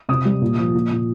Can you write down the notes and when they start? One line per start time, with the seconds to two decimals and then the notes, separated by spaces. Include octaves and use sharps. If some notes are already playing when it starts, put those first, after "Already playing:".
0.09 C3 D#6
0.25 G3
0.41 A#2
0.58 F3
0.74 A#2
0.91 A#2